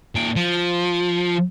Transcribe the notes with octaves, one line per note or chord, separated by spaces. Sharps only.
A#2 G5
F3